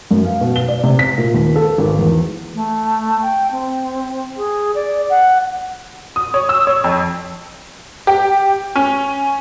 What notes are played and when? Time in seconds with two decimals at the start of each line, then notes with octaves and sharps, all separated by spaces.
0.11 F#2
0.25 F5
0.41 B2
0.56 G7
0.69 D5
0.83 C3
0.99 B6
1.18 A#2
1.34 D#2
1.56 A4
1.78 G#1
1.99 E2
2.54 A3
3.22 G5
3.51 C4
4.37 G#4
4.75 D5
5.10 F#5
6.16 D#6
6.34 C#5
6.49 E6
6.67 C#5
6.84 F2
8.07 G4
8.76 C#4